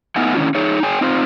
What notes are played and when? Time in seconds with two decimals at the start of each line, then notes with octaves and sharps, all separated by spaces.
0.16 A3 B3 D#4 E5 F#5 G#5
0.35 D3 D#3 C#4 E4 F4
0.55 D#4 G#4 C#5
0.83 G#4 C#5 G5 G#5
1.01 C4 D#4 F4 C5